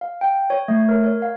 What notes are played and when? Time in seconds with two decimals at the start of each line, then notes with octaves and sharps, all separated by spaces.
0.01 F5
0.21 G5
0.50 C#5
0.68 A3
0.89 A#4
1.04 C#5
1.22 F5